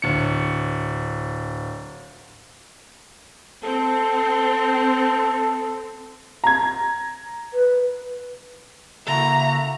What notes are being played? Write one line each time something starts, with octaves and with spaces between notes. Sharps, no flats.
D1 C#7
C4 A4
A#5 G#6
B4
C#3 A#3 E4 F#4 A4 E5 A#5